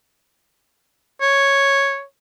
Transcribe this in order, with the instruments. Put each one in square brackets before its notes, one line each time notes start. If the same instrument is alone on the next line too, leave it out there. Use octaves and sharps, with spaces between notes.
[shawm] C#5